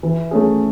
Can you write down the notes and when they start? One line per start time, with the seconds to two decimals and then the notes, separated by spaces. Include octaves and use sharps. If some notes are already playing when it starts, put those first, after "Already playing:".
0.03 E3
0.31 A3 C#4 G#4